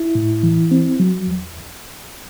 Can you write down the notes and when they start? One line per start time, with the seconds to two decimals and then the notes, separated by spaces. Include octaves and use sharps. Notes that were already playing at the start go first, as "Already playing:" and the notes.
Already playing: E4
0.15 A2
0.43 E3
0.71 C4
1.00 F#3
1.27 E2